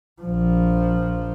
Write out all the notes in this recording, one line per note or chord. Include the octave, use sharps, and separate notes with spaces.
A#1 F3